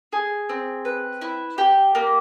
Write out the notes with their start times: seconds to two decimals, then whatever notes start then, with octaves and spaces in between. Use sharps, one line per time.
0.12 G#4
0.49 C4
0.85 B4
1.21 E4
1.58 G4
1.95 A#3